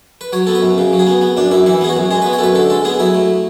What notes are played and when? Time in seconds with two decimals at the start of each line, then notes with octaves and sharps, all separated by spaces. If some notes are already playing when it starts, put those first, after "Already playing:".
0.21 B4
0.33 F#3 C#5
0.47 B3 A4
0.55 B4
0.62 F#2
0.78 C#3
0.93 F#3
0.99 G#4
1.07 B3
1.21 B3
1.37 F#2 D4
1.51 F#2 E4
1.66 E3 E4
1.81 B3 G#4
1.89 F#4
1.97 F#2
2.11 G#3 G#4
2.22 B3 B4
2.33 C#5
2.39 F#2 A4 B4
2.55 D3 A4
2.70 G#3 A4
2.85 B3 G#4
2.99 F#3 E4
3.14 A3